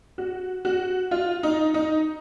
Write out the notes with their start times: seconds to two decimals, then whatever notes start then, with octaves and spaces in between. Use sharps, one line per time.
0.18 F#4
0.65 F#4
1.11 F4
1.43 D#4
1.74 D#4